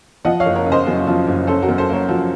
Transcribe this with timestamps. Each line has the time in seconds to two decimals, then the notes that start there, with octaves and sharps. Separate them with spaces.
0.25 F3 D#5 F#5
0.40 C#5 F5
0.46 F#1
0.55 A#4 C#5
0.67 C#3
0.72 C5 D#5
0.87 F#2
1.07 F3
1.27 F#1
1.47 C#4 A4 C5
1.62 F#4 A#4
1.69 F#2
1.78 A4 C5
1.89 A#3 A#4 C#5
2.09 F3 F#4